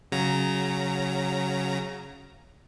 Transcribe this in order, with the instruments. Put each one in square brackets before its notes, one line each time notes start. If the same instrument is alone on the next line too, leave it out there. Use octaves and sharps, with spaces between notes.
[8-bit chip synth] C#3 F#3 A#5